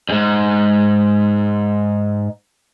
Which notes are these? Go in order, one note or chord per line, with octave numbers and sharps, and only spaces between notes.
F2 G#2